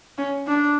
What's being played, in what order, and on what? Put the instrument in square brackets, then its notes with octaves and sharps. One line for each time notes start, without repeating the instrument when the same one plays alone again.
[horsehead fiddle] C#4
D4